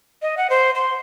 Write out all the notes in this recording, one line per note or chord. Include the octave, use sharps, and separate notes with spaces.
D#5
F#5
C5
C6